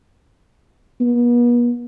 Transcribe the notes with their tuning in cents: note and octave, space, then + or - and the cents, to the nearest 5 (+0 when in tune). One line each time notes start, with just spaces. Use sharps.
B3 -45